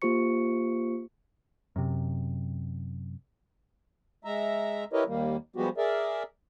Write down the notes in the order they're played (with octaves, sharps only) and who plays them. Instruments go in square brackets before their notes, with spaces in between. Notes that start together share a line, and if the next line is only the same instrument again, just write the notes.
[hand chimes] A#3 F4 G4 C5 C#6 C#7
[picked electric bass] F#2 C3
[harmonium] G#3 E5 A#5
E4 G4 A#4 B4 C#5 D#5
D#2 D#3 G3 A#3
F3 G3 G#3 B3 F#4 G4
G#4 A#4 D5 E5